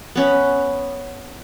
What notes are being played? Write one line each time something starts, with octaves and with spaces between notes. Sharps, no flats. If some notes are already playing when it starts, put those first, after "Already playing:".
B3 C#4 B4